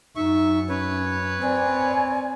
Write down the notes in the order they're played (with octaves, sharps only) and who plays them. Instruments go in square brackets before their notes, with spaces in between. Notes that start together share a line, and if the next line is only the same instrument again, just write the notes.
[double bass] F#2 [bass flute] D#4 [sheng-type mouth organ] E5 C#6
[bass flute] C#4 [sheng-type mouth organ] B4 C#5
[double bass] C4 [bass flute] D5 [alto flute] G#5